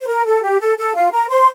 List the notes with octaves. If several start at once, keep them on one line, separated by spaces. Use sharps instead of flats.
C5
A#4
A4
G4
A4
A4
F4 F5
A#4 A#5
C5 C6